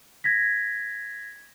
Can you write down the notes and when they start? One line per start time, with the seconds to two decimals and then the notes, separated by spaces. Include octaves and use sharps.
0.24 G#6 A#6 B6